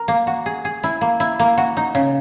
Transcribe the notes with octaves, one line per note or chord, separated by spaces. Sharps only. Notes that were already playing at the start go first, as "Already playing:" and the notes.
Already playing: A#4
A#3
F#4
G#4
G#4
E4
A#3
E4
A#3
F#4
D#4
C#3